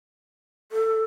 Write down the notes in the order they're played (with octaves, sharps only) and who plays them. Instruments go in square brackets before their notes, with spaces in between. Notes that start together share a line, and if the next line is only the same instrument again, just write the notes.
[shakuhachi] A4